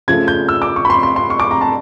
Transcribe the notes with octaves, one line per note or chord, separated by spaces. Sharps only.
C#3 F3 A3 G#6
G6
E6
D6
C#6
B5
C6
C6
C6
C#6
D6
A#5
A5